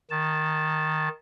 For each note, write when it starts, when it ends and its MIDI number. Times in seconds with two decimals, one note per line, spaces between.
0.11 1.09 51
0.11 1.09 81